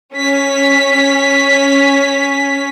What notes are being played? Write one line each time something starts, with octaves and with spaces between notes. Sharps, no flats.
C#4 B6